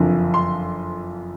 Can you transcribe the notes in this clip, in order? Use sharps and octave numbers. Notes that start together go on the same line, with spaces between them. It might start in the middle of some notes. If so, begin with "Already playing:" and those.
Already playing: F#1 F2 D3 F3
C6